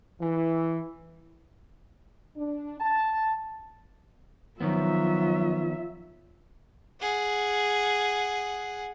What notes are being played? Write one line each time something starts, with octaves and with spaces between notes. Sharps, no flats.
E3
D4
A5
D#3 F3 F#3 B3 F4 E5
G#4 F#5